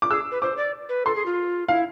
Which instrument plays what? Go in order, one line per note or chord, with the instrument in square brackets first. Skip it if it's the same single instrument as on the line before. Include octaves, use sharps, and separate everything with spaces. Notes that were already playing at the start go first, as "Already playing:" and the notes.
[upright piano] D6
[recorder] G#4 [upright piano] E6
[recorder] B4
[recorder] C5 [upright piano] D6
[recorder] D5
B4
[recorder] A4 [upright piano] C6
[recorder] G#4
F4
[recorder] E4 [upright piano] F5